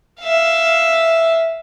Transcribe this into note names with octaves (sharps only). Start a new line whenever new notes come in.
E5 F5